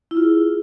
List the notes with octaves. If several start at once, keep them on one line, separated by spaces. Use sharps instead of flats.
E4
F4
G#4